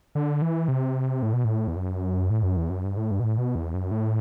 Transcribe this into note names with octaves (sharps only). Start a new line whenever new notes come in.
D3
E3
C3
A2
B2
A2
E2
F#2
A2
F#2
E2
F#2
G2
A2
G2
B2
A2
B2
E2
F#2
A2